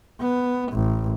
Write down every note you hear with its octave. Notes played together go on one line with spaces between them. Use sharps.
B3
A1